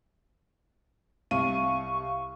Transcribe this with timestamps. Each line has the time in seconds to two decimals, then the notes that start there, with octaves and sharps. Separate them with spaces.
1.31 C2 F5 C#6 D#7